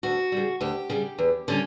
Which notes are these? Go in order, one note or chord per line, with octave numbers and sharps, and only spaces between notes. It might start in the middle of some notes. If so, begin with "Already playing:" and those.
D2 F#4
C#3 G3
D2 G4
C#3 G3
E2
D3 G3 C#4